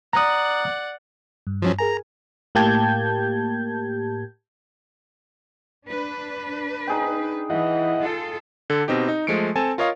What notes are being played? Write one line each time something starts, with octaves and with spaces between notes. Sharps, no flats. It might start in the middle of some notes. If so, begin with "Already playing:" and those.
D5 F#5 A#5 D#6
G2
F3 F#3 C#4
G#4 A#4 G#5 A#5
A2 A#3 G4 A5 G6 G#6
D4 B4
D#4 G#4 G5
E3 E4 D#5 F#5
F4 A4
D3 A4
B2 C4 D#4 G4
D#4
F3 G#3 A3 C#7 D7
C4 A4 G#5 A5
F4 A#4 C#5 D#5 F5